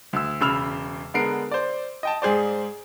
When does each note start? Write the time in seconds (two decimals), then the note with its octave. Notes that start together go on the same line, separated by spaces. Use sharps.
0.13 D2 E6
0.41 E1 C#3 B5 E6 F6 F7
1.14 D3 G#3 B3 A#4 C7 D7
1.51 C5 D5
2.03 D#5 G5 A5
2.22 G#2 G#4 C5 D5